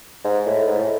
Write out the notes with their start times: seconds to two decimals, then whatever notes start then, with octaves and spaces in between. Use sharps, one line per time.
0.24 G#2
0.46 A2
0.67 G#2
0.79 A2